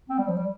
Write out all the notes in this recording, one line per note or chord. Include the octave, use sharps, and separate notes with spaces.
C4
G3
F3
G3